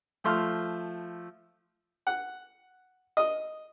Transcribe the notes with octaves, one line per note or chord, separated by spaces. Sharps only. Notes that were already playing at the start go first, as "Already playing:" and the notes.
F3 A3 C6 F6
F#5
D#5